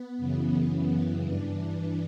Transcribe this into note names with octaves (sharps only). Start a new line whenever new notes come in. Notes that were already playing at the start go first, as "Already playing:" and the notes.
Already playing: B3
F#2 C#3 E3
G2 E3 D4